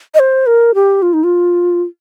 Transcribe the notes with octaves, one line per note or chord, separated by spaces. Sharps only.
D#5
C5
A#4
G4
F4
D#4
F4